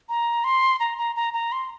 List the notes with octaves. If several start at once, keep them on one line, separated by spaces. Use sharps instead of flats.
A#5
C6
A#5
A#5
A#5
A#5
C6